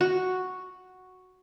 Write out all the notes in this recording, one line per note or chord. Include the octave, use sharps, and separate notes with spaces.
F#4